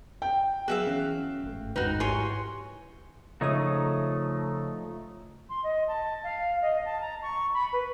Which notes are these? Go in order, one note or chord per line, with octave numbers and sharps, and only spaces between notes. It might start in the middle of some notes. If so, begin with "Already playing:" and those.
G5
F#3 B3 F#4 G#4 E5 F5
E3 C#4
G1 G#2 A3
G#1 E2 G#2 D#4 F#4 B4 F6
E4 G4 C#5 G#5 C6
C#3 F3 A3 D#4 C#5 D#6
C6
D#5
A5
F5
D#5
A5
A#5
C#6
B5
B4